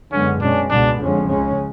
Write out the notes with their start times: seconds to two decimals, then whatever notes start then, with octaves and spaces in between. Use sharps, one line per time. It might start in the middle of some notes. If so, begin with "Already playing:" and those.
0.12 F#2 D3 G#3 B3 C#4
0.41 B2 G#3 C#4 D4
0.71 C#2 B2 G#3 B3 D4
0.99 F2 D3 F3 G#3 C#4
1.29 C#2 C#3 G#3 C#4